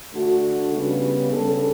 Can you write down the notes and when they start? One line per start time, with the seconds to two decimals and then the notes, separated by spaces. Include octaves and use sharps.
0.13 D3 A3 D4 F#4
0.72 C#3 G3 B3
1.32 C#3 G3 D4 A4